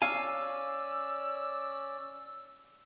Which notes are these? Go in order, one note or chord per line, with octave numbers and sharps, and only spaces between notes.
C#4 D5 F5 G#5 E6